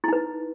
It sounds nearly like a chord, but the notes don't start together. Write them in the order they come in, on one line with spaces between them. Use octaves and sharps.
E4 D#4 B4